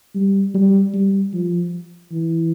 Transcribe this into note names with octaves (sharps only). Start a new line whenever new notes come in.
G3
G3
G3
F3
E3